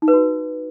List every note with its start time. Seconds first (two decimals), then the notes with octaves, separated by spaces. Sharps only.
0.02 D#4
0.08 B4
0.13 F#4